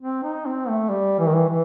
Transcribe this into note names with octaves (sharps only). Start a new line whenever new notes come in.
C4
D#4
C4
A3
G3
E3
D#3
E3
E3